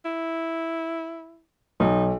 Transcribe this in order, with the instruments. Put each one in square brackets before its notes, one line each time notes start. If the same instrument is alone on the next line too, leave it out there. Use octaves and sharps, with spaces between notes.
[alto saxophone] E4
[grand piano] B1 [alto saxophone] D#4